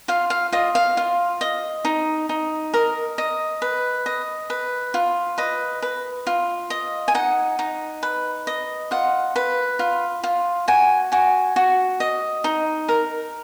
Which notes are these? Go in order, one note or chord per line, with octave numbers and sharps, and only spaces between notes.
F4 F5
F5
F4 D#5
F5
F4
D#5
D#4
D#4
A#4 D#5
D#5
B4
D#5
B4
F4
B4 D#5
B4
F4
D#5
G#5
D#4 F#5
D#4
B4
D#5
F4 F#5
B4
F4
F4
F#4 G#5
F#4 G#5
F#4
D#5
D#4
A#4